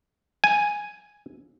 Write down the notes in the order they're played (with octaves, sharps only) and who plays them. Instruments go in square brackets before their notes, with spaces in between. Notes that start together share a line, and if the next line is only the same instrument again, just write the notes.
[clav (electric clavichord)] G#5